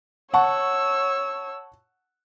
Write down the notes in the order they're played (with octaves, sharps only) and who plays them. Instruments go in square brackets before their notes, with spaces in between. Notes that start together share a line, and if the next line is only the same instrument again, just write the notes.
[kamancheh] C#5 E6 [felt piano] F#5 A5 C#6